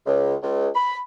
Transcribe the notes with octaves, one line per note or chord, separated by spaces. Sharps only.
C#2
C#2
B5